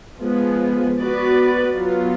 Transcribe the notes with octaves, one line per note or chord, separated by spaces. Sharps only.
F3 G#3 B3
B3 F#4 B4 D5
F#3 B3 F4